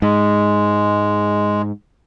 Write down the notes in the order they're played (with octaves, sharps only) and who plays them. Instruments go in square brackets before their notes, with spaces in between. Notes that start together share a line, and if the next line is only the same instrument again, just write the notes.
[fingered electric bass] G#2 [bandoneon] G#3